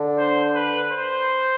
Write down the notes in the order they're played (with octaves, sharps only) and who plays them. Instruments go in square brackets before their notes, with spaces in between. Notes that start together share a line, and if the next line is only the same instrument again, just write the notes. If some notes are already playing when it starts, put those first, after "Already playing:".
Already playing: [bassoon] D3
[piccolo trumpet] C5
B4
C5